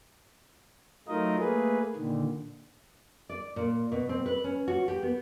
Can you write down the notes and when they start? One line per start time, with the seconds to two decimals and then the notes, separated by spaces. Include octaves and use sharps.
1.08 F#3 A3 D#4 F4 A#4 D#5
1.39 A3 A#3 G#4 B4
1.96 A#2 D3 D#3
3.29 D5
3.56 A#2
3.92 B2
4.09 C4
4.26 B4
4.44 C#4
4.68 F#4
4.88 G4
5.03 B3